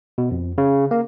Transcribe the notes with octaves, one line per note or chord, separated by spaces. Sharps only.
B2
F2
C#3
A#3